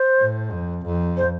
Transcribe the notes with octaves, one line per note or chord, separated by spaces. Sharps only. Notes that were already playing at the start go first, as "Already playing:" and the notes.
Already playing: C5
A2
F2
F2
C5